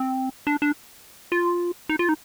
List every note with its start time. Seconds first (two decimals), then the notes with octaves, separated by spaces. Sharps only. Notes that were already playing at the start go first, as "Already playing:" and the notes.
Already playing: C4
0.47 D4
0.62 D4
1.32 F4
1.89 D#4
1.99 F4
2.09 D#4